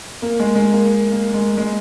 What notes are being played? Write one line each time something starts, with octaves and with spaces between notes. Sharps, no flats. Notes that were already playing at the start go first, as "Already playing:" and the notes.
A#3
G#3
G#3
A#3
A#3
G#3
G#3